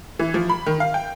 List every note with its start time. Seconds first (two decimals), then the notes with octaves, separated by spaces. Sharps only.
0.19 E3
0.34 F3
0.50 B5
0.66 D#3
0.80 F5
0.94 G5